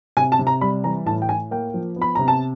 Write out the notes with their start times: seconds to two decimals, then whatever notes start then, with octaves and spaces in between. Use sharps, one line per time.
0.17 C3 G#5
0.32 A5
0.39 C3
0.47 A#5
0.61 G3 B5
0.84 E3 A#5
1.06 A2 A5
1.22 G5
1.29 A2 G#5
1.51 A#3 G5
1.74 F3
1.96 B3
2.02 B5
2.15 C3 A#5
2.28 A5